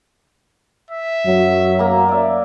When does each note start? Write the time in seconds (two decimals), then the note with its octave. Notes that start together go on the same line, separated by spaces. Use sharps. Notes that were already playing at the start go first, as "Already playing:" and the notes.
0.90 E5
1.26 F#2 F#3
1.79 A#3 A#5
2.08 D5 E5